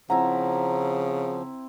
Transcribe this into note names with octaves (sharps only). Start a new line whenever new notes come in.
C#3 F3 C4 E4 F#5 A#5